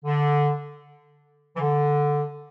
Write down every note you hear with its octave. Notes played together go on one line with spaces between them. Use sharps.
D3
E3
D3